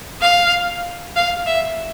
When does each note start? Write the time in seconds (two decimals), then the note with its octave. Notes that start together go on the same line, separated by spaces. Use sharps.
0.21 F5
1.16 F5
1.46 E5